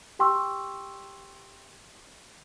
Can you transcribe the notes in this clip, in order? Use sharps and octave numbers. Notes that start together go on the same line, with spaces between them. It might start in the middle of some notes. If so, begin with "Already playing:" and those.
G4 G5 C6 C#6 E6